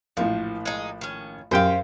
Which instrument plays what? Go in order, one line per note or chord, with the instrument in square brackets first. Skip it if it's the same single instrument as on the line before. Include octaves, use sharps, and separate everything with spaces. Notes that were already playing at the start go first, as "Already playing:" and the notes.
[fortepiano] A#1 A2 [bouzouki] F3
[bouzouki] G#3 D#4
D#3 C#4
[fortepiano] F#2 G4 G5 [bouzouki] C5 F5